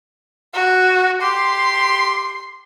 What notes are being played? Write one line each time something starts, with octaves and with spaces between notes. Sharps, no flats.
F#4
G4 C6